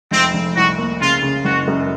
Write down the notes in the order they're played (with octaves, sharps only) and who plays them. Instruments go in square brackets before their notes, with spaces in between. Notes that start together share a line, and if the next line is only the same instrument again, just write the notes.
[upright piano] F1 [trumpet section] C4
[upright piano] F1
[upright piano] C2 [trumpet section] F#4
[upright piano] A#3
[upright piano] C#3 [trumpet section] F4
[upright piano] C#3
[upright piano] F#1 [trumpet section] F#4
[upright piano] F#2